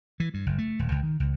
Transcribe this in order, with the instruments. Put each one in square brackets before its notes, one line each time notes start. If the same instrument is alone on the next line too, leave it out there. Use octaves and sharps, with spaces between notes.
[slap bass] E3
G2
F#1
A3
D#1
C#2
D#3
C#2